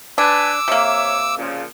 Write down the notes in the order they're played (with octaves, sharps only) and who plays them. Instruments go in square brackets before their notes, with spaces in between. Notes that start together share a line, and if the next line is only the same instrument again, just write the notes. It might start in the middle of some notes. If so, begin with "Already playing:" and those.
[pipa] D4 [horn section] B4 G#5 A5 [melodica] D6 E6
[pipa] C3 A#3 [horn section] C#5 E5
[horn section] A#2 C#3 F3